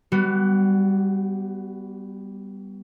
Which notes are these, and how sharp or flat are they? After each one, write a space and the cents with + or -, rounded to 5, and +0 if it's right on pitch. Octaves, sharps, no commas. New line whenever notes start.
G3 +0 B3 +0 F#4 +30